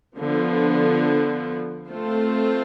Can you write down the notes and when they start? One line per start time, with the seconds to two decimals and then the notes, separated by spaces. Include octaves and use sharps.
0.16 D3 F3 B3
1.89 A3 C4 F4 A4 C5